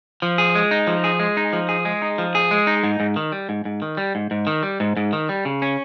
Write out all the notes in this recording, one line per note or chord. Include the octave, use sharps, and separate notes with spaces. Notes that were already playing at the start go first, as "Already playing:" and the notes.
F3
G#4
G#3
D#4
F3
G#4
G#3
D#4
F3
G#4
G#3
D#4
F3
G#4
G#3
D#4
G#2
G#2
D#3
G3
G#2
G#2
D#3
G3
G#2
G#2
D#3
G3
G#2
G#2
D#3
G3
C#3
C#4